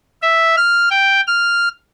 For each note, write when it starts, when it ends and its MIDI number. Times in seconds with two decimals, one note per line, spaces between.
0.22 0.56 76
0.57 0.89 89
0.90 1.21 79
1.27 1.69 89